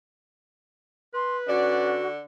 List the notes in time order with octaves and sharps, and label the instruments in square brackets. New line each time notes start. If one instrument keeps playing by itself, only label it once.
[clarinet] B4 [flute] C6
[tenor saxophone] D3 [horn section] C#4 D5 [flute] F#4